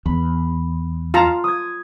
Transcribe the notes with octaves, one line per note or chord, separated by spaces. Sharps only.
E2 B5
F4 A5 A#5
D#6 G#6